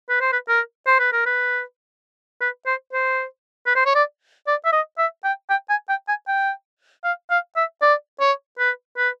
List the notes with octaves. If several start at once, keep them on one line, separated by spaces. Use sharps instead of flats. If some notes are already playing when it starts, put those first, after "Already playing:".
B4
C5
B4
A#4
C5
B4
A#4
B4
B4
C5
C5
B4
C5
C#5
D5
D5
E5
D#5
E5
G5
G5
G#5
G5
G#5
G5
F5
F5
E5
D5
C#5
B4
B4